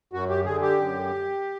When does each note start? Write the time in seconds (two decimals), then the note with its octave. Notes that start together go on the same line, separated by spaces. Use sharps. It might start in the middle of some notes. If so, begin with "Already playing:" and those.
0.13 F#2 F#4
0.29 G4
0.45 D3 G#4
0.62 G4
0.79 F#2